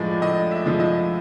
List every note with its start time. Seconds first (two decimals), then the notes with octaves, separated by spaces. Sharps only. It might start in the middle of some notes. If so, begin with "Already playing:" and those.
Already playing: A2 F3 G#3 D5 D#5
0.21 A2 D#5
0.51 E5
0.66 F3 G#3
0.80 D#5